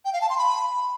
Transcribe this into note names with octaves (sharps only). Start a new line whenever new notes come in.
G5
F5
A5
C6
B5